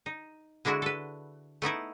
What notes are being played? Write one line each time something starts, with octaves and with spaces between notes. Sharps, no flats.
D#4
D3 G#3 D4 E4 F#4
A4 B4
A3 B3 D#4 E4